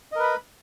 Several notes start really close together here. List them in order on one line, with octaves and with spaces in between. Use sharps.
D#5 A#4 B4 B5